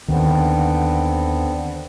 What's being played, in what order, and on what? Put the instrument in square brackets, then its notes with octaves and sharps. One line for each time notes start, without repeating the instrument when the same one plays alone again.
[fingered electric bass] D#2 D#3 [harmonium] D3 B3 C4